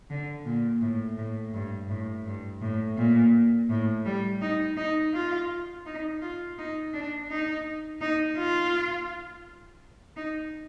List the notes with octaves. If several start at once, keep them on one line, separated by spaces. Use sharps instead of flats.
D3
A#2
A2
A2
G2
A2
G2
A2
A#2
A2
G3
D#4
D#4
F4
D#4
F4
D#4
D4
D#4
D#4
F4
D#4